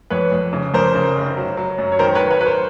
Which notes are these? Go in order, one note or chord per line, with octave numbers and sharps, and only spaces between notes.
F2 B4 C#5
F2
C#3
F2 A#4 C5
C#3
F1
F#3
F#3
F#2
C#5
D#3 A#4 C5
B4 C#5
F#3
B4 C#5
F#3 B4
A#4 C5